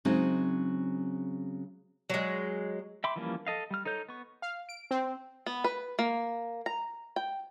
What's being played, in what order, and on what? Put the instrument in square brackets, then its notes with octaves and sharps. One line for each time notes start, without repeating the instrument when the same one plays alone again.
[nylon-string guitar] C#3 F#3 G#3 C4 D#4
[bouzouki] F#3 G#3
[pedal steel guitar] E5 G5 B5 C6 D6
E3 F3 G3 A#3 C#4
A4 D#5 F5
G3 F6
D#4 A4 C#5 G6
B3 C#6
[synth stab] F5
D7
C4
[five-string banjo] B3
B4
A#3
A#5
G5